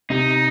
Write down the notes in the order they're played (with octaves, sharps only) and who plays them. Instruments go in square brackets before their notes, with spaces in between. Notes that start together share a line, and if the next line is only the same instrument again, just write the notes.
[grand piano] C3 [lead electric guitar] D#4